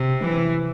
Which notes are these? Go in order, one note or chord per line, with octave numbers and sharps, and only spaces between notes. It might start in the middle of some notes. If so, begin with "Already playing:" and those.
Already playing: C3
E3